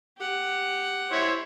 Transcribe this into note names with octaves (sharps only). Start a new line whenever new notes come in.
G4 F#5
E4 C5 C#5